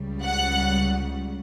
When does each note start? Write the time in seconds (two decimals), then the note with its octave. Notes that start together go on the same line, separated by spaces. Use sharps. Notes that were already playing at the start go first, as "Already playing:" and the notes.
Already playing: C#2 C#3 G3
0.24 F#5 F#6